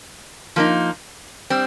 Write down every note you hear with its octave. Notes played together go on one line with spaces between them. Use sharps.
F3 A#3 D#4
G3 C4